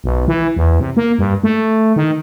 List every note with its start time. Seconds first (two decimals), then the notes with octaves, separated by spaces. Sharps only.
0.04 B1
0.28 E3
0.57 E2
0.80 C3
0.97 A#3
1.19 G2
1.44 A3
1.96 D#3